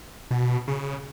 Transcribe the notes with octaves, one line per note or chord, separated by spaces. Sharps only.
B2
C#3